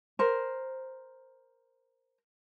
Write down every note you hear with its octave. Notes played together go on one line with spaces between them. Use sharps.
A#4 C5